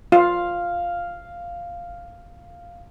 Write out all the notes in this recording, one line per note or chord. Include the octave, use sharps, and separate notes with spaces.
F4 F5